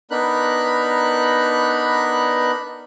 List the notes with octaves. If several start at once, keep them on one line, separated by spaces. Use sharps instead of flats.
B3 D4 D#4 A#4 B5 F#6